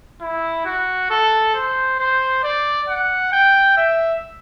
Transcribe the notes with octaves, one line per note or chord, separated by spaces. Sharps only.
E4
F#4
A4
C5
C5
D5
F#5
G5
E5